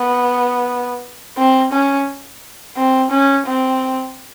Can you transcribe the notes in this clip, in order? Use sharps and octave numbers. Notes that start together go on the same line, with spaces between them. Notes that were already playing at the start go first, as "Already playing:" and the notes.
Already playing: B3
C4
C#4
C4
C#4
C4